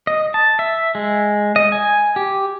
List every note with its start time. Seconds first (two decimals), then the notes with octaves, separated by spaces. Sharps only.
0.07 D#5
0.34 A5
0.59 E5
0.95 G#3
1.56 D#5
1.72 G#5
2.16 G4